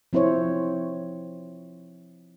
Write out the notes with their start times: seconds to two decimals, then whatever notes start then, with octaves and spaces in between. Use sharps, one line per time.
0.13 F3 C4 E4 C5 C#5